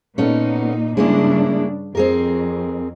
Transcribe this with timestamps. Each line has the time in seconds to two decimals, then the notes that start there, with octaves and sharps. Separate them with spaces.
0.18 A#2 A3 B3 C#4 D#4
0.97 G2 C#3 G#3 A#3 D4 E4
1.95 F2 C4 G#4 A#4